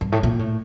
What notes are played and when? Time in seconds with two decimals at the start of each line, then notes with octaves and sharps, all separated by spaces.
0.01 G2
0.12 A2
0.23 A#2
0.39 A2